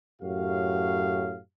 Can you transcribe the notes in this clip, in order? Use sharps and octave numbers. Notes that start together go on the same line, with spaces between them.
F#2 A2 F#4 G4 F5